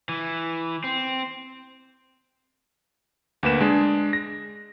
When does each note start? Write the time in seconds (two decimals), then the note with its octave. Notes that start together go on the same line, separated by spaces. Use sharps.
0.09 E3
0.84 C4
3.43 D2 A#3 B4 E7
3.60 G#3 D4 G#4
4.13 A#6